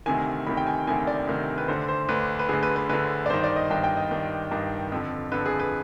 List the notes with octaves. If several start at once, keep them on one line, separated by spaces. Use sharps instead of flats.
D2 C3 D#3 G#5
D2 C3 D#3 B5
G5
G#5
D2 C3 D#3 G#5
D5
D2 C3 D#3
B4
D2 D3 C5
C5
D2 D3 B4
B4
D2 D3 G#4
B4
B4
D2 D3 B4
D5
G2 D#3 C5
D5
D#5
G2 D#3 G5
G5
D#5
G2 D#3
G2 D#3
F2 D3
F2 D3 B4
G#4
B4